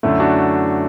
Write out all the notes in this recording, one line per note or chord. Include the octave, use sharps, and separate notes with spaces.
F#2 D3 A3 E4
D4 F#4